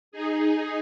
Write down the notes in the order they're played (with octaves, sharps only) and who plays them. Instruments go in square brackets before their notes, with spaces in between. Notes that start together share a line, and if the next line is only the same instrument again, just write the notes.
[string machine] D#4 G#4